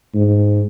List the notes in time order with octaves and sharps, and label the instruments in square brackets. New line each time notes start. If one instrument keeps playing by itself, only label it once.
[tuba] G#2